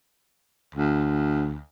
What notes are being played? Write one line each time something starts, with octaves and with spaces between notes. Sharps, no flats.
D2